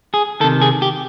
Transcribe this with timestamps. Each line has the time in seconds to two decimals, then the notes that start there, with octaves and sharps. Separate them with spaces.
0.14 G#4
0.40 D#3 A4
0.44 C3
0.62 G#4
0.82 G4